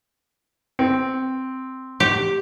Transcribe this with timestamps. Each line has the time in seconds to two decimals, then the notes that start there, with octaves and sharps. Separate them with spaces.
0.79 C4
2.00 G4